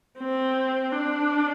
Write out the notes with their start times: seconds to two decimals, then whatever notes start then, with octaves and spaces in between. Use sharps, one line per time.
0.19 C4
0.92 D4